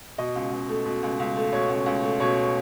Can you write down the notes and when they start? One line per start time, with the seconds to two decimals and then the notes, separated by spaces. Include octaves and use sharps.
0.18 B2 D#5
0.35 C#2
0.52 C#2
0.69 A3
0.85 B2
1.03 C#2
1.19 C#2
1.36 A3
1.53 B2 C#5
1.69 C#2
1.86 C#2
2.03 A3
2.20 B2 C#5